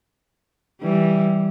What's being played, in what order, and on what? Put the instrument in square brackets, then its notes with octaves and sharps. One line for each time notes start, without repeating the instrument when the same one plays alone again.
[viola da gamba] E3 G3